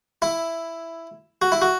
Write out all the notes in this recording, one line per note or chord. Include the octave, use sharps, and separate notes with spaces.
E4
F#4
E4
F#4